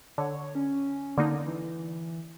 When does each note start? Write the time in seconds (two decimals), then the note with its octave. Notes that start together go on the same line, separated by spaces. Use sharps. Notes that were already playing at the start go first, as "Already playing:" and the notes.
0.18 D3 C#5
0.55 C#4
1.18 D3 A#3 D#4 D5
1.46 E3